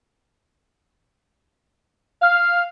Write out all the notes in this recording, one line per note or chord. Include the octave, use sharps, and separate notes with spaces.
F5